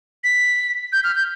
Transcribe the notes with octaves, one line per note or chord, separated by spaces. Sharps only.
B6
G6
F6
G6